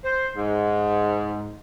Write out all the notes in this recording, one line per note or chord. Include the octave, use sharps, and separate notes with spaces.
C5
G#2